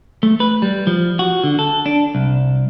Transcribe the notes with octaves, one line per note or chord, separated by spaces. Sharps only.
A3
B4
G3
F3
F#4
D3
A4
D4
C2